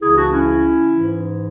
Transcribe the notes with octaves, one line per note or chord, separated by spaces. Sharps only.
C#2 C#3 E3 E4 G#4
D4 F#4
C#4 E4
G#2 E3